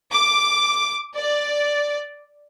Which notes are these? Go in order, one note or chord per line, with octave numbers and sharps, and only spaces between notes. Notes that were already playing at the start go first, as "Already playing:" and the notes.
D6
D5